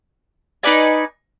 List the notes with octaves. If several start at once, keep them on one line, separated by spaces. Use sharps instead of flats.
D#4 B4 D5 G#5